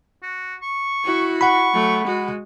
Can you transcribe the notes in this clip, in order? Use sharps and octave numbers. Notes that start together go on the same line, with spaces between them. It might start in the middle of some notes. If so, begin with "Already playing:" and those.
F#4
C#6
E4 F#4
F#5 B5 C#6
F#3 A3
G#3 F#4